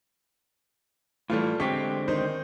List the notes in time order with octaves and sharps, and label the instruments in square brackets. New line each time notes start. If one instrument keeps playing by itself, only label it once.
[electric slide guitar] A2 E3 [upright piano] G3 A3 F4
[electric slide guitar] D3 G#3 C4 [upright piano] G4 C#6 B6
[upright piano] D#3 D#4 C5